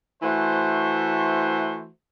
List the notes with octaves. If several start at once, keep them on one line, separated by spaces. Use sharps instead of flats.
E3 A3 F#4 C5